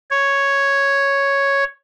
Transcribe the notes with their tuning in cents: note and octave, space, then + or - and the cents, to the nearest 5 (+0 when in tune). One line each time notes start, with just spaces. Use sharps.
C#5 +0